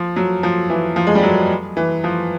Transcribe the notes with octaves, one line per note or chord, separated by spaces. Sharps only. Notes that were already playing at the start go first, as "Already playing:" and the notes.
Already playing: F3
F#3
F3
E3
F3
G#3
G3
F#3
E3
F3